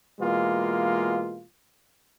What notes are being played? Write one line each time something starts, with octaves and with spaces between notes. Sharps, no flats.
B2 E3 G#3 A#3 F4